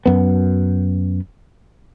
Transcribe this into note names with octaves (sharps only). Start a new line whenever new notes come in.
F#2 B3